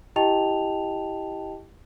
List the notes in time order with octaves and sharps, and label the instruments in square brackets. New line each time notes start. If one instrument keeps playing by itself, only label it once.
[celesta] E4 G4 D#5 G5 A5 F7